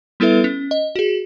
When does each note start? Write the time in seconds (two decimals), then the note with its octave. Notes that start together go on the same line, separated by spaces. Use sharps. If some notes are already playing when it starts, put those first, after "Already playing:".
0.20 G3 B3 E4 A4 B4 E5
0.44 C#4
0.71 D#5
0.96 F#4 G#4